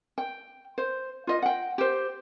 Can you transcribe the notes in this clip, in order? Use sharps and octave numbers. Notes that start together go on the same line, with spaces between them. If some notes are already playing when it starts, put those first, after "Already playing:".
G5
C5
F4 D#5
F#5 G5
G4 C5